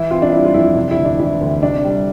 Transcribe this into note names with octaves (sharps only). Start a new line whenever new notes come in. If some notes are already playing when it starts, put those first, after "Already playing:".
Already playing: E3 E4
C4 F4
D4
G3 E4
F4
F2 E4
C3 D4
E4
D2
D4
E3 E4
D2
C3 D4
G3